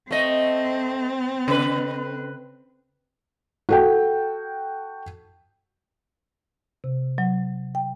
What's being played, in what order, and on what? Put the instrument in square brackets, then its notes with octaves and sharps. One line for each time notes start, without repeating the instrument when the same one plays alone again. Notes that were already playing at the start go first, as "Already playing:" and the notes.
[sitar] A3 D#5 [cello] C4
[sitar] C#3 B4
[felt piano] F#4 A4 G5
[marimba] C3
F#3
G5